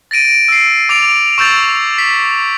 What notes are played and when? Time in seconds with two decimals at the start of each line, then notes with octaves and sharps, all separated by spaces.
0.11 A6 A#6 D7 D#7
0.48 E6 C7
0.89 D6 A6 D7 F7
1.38 C#6 E6 G6 A6 F7
1.98 B6